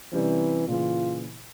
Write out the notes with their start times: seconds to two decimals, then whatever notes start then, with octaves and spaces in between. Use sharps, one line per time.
0.13 C3 E3 G3 C#4
0.68 A#2 C#3 E3 F4